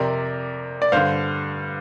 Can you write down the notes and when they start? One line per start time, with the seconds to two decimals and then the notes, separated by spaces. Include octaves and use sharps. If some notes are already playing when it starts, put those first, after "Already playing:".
Already playing: F2 C3 A#4 D5
0.82 D5
0.92 G2 D3 C5 F5